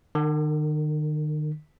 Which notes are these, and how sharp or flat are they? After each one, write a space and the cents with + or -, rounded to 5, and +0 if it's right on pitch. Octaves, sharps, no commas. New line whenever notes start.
D#3 -40 A#4 -10